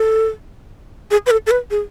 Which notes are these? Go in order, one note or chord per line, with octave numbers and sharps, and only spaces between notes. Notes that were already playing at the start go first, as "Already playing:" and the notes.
Already playing: A4
G#4
B4
A4
A4
B4
G#4